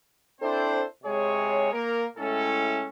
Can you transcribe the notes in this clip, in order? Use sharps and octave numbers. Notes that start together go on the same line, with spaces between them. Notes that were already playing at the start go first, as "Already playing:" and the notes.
C4 D4 E4 A4 C5
C3 G#3 G#4 C#5
A#3 A#4
A2 G#3 C#4 E4 A4